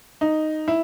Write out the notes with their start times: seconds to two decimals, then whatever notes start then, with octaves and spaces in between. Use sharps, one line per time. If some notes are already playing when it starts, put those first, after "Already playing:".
0.21 D#4
0.68 E4